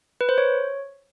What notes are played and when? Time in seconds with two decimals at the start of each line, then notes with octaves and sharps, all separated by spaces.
0.21 B4
0.29 C5
0.38 C#5